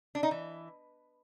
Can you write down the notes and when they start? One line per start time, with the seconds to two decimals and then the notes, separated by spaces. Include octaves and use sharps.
0.15 D4
0.23 D#4
0.31 E3